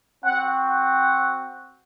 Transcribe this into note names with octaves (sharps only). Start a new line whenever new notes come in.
C4 F#4 F#5
F#5